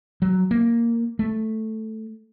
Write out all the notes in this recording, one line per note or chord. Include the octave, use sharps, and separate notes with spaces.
F#3
A#3
A3